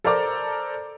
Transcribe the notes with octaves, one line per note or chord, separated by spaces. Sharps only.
A4 A#4 C5 D5 A#5 D6